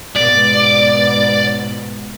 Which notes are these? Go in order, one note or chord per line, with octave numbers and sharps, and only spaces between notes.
G#2 B2 B3 D5